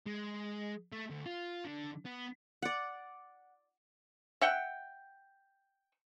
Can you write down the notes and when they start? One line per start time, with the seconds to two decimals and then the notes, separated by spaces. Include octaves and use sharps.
0.06 G#3
0.92 A3
1.10 D2
1.26 F4
1.65 D3
2.05 B3
2.62 D5 F#5
4.41 E5 F#5 G5